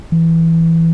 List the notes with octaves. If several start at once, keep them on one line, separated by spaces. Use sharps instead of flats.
E3